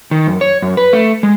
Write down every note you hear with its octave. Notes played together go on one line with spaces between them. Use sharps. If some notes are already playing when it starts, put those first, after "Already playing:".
D#3
F#2
C#5
F#2
B4
A3
G#3